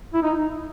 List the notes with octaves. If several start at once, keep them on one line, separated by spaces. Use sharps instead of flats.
E4
D#4